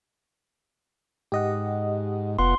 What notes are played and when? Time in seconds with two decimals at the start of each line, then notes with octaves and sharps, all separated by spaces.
1.32 G#2 G4 D#5 F#5
2.39 F1 B3 F4 F#5 C6